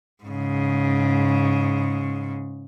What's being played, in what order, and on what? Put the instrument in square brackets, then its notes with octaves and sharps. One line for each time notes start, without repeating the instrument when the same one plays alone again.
[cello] G#2 C#3